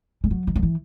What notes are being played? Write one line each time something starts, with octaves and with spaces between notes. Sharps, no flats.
G#3
F#3
D#3
F#3
E3